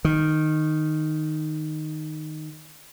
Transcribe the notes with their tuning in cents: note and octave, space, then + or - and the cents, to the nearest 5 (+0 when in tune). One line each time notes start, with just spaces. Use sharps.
D#3 -5